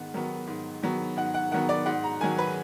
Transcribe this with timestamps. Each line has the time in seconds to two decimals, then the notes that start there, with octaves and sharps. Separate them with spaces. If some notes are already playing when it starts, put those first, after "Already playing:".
Already playing: G#2 D#3 B3 F#5
0.14 D#3 F#3 B3
0.47 G#2
0.82 D#3 F#3 B3
1.17 G#2 F#5
1.34 F#5
1.52 D#3 F#3 B3 F#5
1.69 D5
1.86 G#2 F#5
2.04 A#5
2.21 D#3 F#3 G#5
2.38 B4